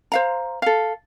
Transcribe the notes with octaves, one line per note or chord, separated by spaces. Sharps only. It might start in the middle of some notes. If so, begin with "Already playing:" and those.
C5 F5 A#5
A4 F5